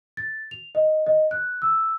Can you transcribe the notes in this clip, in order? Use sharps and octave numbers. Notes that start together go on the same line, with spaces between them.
A6
F7
D#5
D#5
F#6
E6